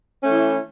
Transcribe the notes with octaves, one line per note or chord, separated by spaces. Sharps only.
E3 A3 C#4 E4